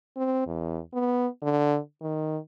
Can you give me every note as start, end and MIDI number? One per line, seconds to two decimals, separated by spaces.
0.17 0.46 60
0.47 0.79 40
0.93 1.27 59
1.42 1.78 50
2.01 2.38 51